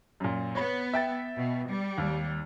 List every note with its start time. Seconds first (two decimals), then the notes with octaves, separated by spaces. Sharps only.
0.20 F#2 A#2
0.55 B3 C#5 B5
0.94 E5 G5 A6
1.37 B2
1.68 G3
1.98 D#2